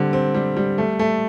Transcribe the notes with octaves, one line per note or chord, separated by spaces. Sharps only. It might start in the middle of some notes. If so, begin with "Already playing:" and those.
Already playing: D3 G3 C4
C4
G3
G3
A3
A3